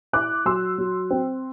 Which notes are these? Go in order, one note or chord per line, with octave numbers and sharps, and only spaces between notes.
E4 D6 F#6
F#3 C6 E6
F#3
C4